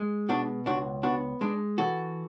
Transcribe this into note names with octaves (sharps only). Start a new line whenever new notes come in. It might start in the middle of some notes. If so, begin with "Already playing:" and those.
Already playing: G#3
B2 D4 F#4
C#2 D4 F#4
B3 D4 F#4
G#3 D4
E3 F#4 A4